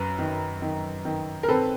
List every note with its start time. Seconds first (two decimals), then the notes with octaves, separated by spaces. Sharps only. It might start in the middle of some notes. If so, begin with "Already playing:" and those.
Already playing: F#2 B4
0.19 D#3
0.62 D#3
1.05 D#3
1.43 A#4
1.48 C4 A4 B4